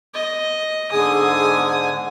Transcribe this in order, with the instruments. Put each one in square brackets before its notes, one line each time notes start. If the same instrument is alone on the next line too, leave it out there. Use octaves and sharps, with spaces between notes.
[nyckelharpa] D#5
[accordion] G#2 D3 G#5 [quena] G#4 [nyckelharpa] D#6